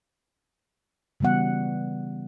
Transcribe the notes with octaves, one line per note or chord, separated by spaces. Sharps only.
C#3 E3 G3 B3 F#5